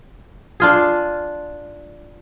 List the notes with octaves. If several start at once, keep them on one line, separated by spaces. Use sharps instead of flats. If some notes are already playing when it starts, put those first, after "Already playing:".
D4 F4 G#4